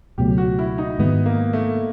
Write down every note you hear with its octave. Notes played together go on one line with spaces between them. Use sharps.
C#2 B2 F#3 A3 G4
F#4
E4
D#4
G#2 D#3 G#3 B3
A#3
A3